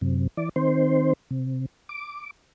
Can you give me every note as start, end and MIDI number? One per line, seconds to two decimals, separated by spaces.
0.01 0.27 42
0.01 0.27 48
0.37 0.49 52
0.37 0.49 74
0.56 1.13 51
0.56 1.13 60
0.56 1.13 72
1.31 1.66 48
1.89 2.30 86